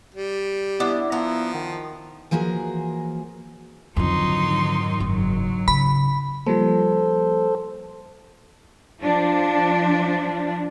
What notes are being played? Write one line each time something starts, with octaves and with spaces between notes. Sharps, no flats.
G3
B3 D4 E4
F3 B3 A#5
D#3
E3 F3 A#3 F#4 G#4 A#4
F2 G#2 D3 D#3 F#3 D#4 C6
F#1 F#3
C#3 B5
F3 G3 A#3 A4 C5
F3 D4